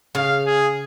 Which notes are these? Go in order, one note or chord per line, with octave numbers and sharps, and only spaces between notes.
C#3 F5
G#4